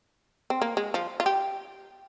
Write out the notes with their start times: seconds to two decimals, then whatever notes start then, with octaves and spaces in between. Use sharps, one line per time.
0.50 C4
0.62 A#3
0.77 G#3
0.94 F3
1.20 F4
1.26 G4